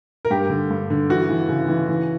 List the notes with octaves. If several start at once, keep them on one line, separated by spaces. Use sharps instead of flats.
A#4
G2 G4
D3
G2
D3
E3 F#4
E3
C#3
E3
E3